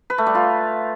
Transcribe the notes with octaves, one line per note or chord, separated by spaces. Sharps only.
B4
A3
G3
F4